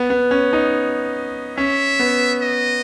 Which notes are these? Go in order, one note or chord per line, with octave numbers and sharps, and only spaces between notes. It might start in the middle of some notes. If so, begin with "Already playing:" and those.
Already playing: B3
B3
C#4
D#4
C#4 E5
B3
D#5